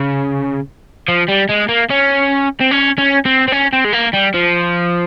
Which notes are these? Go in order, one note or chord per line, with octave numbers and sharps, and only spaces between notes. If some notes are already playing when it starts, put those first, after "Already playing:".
Already playing: C#3
F3
G3
G#3
A#3
C#4
C4
C#4
C#4
C4
C4
C#4
C4
G#3
A#3
G3
F3